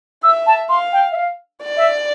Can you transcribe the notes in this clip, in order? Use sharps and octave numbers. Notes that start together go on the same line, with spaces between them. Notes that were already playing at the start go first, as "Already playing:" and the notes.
E5 E6
A5
F5 C6
G5
E5
F5
D5
E5